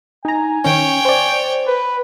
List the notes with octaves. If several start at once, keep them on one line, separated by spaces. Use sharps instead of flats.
D#4 G#5 A#5
D#3 C#4 C#5 G5
C5 D5
B4